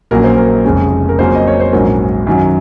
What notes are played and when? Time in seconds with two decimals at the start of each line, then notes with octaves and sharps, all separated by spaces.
0.11 A#1 A#2 F#3 A#3 C#4 A#4
0.24 C5
0.37 A#4
0.64 F1 F2 C#3 G#3 C#4
1.09 A#4
1.19 F2 C#3 F#3 A#3 C#4 C5
1.35 D#5
1.47 C#5
1.60 C5
1.72 A#1 G#2 F#3 C#4 A#4
2.27 F#2 D#3 F#3 C#4